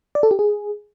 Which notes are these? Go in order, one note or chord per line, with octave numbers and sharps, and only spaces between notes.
D5
A4
G4
G#4